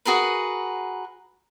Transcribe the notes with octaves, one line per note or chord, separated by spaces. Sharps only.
F#4 G#4 A#4 B4